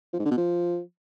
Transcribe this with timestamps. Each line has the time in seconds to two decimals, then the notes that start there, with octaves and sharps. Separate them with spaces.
0.13 F3
0.19 G#2
0.25 D3
0.31 B2
0.37 F3